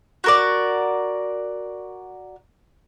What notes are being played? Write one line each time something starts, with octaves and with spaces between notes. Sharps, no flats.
F#4 A#4 D5